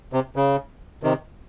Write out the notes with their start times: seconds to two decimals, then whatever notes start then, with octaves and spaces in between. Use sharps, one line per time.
0.13 C3
0.36 C#3
1.03 C3 D#3